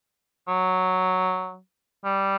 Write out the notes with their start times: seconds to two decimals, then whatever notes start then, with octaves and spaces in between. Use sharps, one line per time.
0.48 F#3
2.05 G3